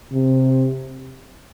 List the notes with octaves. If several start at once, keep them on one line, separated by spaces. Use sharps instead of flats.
C3